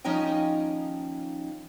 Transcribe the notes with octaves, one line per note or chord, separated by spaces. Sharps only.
D#2 F3 C#4 D#4 D#5 G5